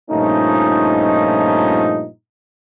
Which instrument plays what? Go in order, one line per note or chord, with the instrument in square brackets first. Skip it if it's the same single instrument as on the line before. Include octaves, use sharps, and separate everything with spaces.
[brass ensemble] G2 A#2 F3 A3 C#4 D#4